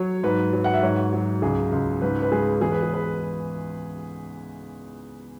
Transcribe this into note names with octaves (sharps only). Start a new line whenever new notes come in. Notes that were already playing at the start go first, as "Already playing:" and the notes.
Already playing: F#3 C#5
G#2 B4
F#3
F#5
E5
G#2 C#5
F#3
C#2 G#4
C#2
G#2 B4
B4
G#3 G#4
E2 G#4
B4
G#4
B4